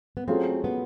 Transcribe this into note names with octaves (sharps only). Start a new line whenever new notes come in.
B3
F#3 A3 C4 C#4 F4 G#4
B3